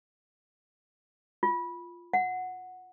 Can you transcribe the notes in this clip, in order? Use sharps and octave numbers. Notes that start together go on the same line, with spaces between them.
F4
F#5